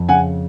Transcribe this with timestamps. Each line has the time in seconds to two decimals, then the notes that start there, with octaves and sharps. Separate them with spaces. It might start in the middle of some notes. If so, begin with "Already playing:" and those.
Already playing: F2
0.09 C#3 F#5 G#5